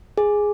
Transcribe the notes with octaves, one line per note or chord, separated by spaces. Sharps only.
G#4